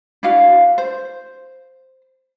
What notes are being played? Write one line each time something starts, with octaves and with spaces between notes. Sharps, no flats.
D4 E4 F#4 F5
C5